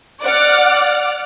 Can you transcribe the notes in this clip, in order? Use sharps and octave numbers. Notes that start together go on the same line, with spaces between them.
D5 F#5 F6